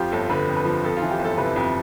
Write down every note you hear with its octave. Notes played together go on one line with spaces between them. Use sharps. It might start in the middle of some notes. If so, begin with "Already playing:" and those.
Already playing: F2 F3 F4 G4
G1 A4
D3 B4
F2
B4
F3
F2 A4
F4
E3
G4
G1 A4
C3 B4
F2